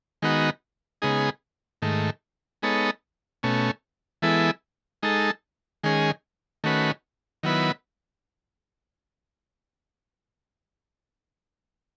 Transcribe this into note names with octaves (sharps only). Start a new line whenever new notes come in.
D#3 G#3 B3 D#4 F#4
C#3 G#3 B3 D#4 G#4
G#2 D#3 A3
G#3 B3 D#4 A4 C#5
B2 A3 C#4
E3 G#3 B3 E4 A4
G#3 D#4 A4
D#3 G#3 C#4 G#4
D#3 A3 C#4 F#4 B4
D#3 F#3 B3 E4 B4